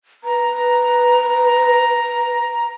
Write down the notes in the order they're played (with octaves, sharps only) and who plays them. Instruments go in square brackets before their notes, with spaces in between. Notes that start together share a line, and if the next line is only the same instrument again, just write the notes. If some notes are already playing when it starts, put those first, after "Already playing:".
[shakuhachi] B4 [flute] A#5